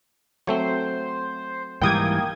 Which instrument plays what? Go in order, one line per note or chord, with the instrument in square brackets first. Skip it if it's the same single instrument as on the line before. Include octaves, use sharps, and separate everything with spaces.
[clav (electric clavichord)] F#3 A3 C4 [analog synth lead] C5
[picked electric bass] G#2 E3 G3 [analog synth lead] A#3 [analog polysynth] G5 D#6 G#6